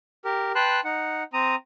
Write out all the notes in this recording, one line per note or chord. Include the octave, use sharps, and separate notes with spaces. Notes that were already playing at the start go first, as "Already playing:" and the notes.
G4 A#4
B4 G5 A5 C6 F#6
D#4 F#5
C4 A#5 D#6